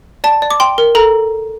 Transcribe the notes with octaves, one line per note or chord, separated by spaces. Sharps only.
D5 A5
D5
D6
G5 C6
A#4
A4 A#5